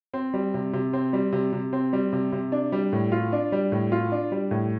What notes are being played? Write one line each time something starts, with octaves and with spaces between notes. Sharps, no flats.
C4
G3
C3
C3
C4
G3
C3
C3
C4
G3
C3
C3
D4
G3
A2
F4
D4
G3
A2
F4
D4
G3
A2